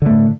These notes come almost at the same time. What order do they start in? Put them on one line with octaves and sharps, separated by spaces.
D3 A3 A2